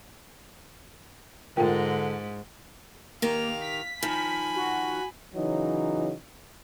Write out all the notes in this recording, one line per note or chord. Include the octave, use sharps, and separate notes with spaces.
G#2 D3 F4 A#4 G5
D#3 A#3 G4 F5 F7
B6
D#3 F3 G#5 B5
F#4
C#3 E3 F#3 D#4